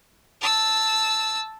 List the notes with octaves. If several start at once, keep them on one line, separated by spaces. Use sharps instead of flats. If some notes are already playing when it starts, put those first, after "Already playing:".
A5 E6